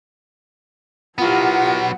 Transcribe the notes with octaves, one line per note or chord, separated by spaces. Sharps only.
F#3 B3 E4 F4 G4 A#4 F#5